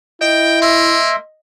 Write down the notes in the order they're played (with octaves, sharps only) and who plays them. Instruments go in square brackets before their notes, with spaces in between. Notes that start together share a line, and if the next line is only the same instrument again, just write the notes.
[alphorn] E4 [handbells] D#5 [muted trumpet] G5
[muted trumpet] A#3 [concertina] E5 C6